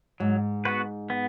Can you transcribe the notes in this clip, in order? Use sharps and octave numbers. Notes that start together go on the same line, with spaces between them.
G#2 F#3
B3 F#4 B4
B3